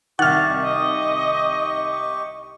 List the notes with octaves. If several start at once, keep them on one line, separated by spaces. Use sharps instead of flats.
C2 D#3 G4 F#5 C#6 F6 A6
D#5